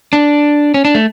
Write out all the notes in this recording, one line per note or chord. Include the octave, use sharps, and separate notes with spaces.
D4
C#4
D4
A3